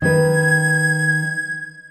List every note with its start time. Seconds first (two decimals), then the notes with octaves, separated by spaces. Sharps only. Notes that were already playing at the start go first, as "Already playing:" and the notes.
0.02 D#3 B4 G#6